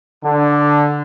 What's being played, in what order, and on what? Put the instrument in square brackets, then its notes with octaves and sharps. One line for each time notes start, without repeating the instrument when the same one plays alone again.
[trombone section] D3